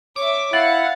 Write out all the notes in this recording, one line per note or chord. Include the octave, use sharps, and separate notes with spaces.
C#5 E5 D6
E4 F5 F#5 A6